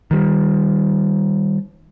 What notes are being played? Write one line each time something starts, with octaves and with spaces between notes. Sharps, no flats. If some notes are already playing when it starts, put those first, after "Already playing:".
D#3 G3